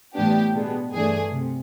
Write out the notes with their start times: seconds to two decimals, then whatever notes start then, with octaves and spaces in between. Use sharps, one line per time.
0.15 A2 E3 G3 B3 D4 G4
0.54 B2 G#3 B3 D4
0.92 G2 E3 A3 D4 G#4
1.32 C3